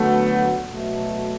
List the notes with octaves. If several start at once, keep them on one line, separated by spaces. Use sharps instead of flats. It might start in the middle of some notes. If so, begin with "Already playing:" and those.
Already playing: D3 F#3 A3 B3 F#4
B2 F#3 A3